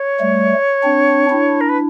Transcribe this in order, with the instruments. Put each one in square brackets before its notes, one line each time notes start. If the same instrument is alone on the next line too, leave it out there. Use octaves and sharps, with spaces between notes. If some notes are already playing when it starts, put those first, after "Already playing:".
Already playing: [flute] C#5
[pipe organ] G3 A3
C4 D4
D4 E4
[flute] A#4
B4